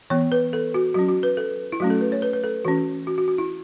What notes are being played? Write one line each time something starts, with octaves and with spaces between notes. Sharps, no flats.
E3 B3 C#5
B4
A4
F#4
F#3 C#4 F#4
F#4
B4
A4
E4
F#3 A3 C#4 F#4
A4
B4
C#5
B4
B4
A4
E3 C#4 F#4
F#4
F#4
F#4
E4